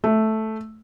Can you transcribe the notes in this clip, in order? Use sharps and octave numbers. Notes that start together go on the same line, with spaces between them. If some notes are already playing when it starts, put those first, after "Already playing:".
A3